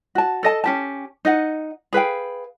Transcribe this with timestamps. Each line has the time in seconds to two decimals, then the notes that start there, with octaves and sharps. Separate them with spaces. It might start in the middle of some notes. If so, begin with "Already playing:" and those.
0.15 F#4 A5
0.43 A4 D#5 A5
0.64 C#4 G4 A5
1.25 D#4 D#5 F#5
1.93 G#4 B4 F5 G5